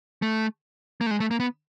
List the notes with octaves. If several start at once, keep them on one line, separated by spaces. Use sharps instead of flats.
A3
A#3
A3
G#3
A3
A#3
B3